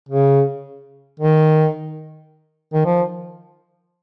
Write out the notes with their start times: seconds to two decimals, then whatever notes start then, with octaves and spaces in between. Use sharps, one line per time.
0.09 C#3
1.20 D#3
2.73 D#3
2.86 F3